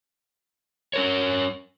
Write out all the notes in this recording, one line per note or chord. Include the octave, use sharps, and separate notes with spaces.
C#4 A#4 C#5